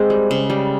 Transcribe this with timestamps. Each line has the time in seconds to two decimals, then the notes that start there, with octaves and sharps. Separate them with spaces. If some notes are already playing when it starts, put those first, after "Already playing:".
Already playing: G#3 C4
0.10 G3
0.31 C#3
0.50 G3